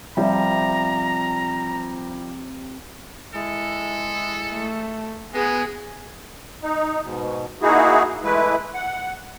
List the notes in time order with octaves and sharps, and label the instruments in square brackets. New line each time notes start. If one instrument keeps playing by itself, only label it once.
[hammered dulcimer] C3 A5 [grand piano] F3 G3 F4 [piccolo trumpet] A#5
[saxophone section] G#3 E4 [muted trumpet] A4
[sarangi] A3
[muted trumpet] G#3 [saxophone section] B3 [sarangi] G#4
[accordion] D#4
G#2 B2
A#3 D#4 E4 F#4 G#4
E3 G#3 A3 E4 B4
F#5